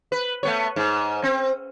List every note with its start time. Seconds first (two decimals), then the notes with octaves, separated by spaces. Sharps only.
0.12 B4
0.43 A3 B3 C#5
0.76 G#2
1.23 C4